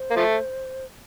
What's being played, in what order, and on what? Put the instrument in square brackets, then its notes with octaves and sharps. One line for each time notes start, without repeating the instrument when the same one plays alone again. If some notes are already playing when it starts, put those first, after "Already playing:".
Already playing: [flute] C5
[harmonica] A#3
F3 A3